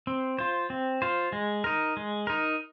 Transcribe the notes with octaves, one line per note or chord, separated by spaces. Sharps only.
C4
F4 C5
C4
F4 C5
G#3
D#4 A#4
G#3
D#4 A#4